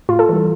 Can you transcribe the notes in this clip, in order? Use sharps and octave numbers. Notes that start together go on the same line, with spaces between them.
A2 F4
A4
E3 G3